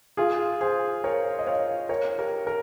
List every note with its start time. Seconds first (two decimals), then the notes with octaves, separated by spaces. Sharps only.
0.17 F4 G#4
0.61 G#4 C5
1.04 A#4 C#5
1.39 D#5
1.47 C#5 F5
1.89 A#4 C#5
2.18 G4 A#4
2.47 A#4